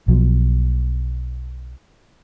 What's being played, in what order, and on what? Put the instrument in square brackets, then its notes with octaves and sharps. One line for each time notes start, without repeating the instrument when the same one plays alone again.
[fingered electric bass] B1 B2 F3 F#3